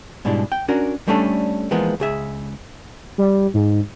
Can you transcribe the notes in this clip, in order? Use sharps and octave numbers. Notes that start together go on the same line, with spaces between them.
G#2 B2 G3 G#3 D4 E4
G5
C#4 D4 F#4 A#4
G3 A3 C#4 D4 A4
E3 F3 G#3 A#3 B3 F4
C#2 G#4 E5
G3
G#2